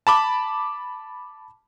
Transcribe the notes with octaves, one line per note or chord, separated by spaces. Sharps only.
A5 B5 D6